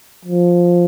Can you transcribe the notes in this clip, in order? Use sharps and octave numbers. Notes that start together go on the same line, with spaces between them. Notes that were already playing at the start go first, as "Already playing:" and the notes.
F3